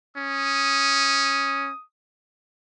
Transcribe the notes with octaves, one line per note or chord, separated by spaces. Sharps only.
C#4 D#6